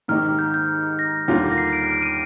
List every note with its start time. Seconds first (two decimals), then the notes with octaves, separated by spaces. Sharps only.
0.08 G#2 D#3 A#3 D#4 G4 F6
0.39 G6
0.46 F6
0.54 G6
0.99 A#6
1.28 D#2 D3 G3 A#3 F4
1.52 A#6
1.58 C7
1.73 D7
1.89 D7
2.02 D#7